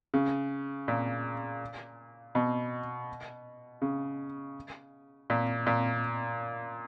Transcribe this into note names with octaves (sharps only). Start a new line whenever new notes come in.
C#3
A#2
B2
C#3
A#2
A#2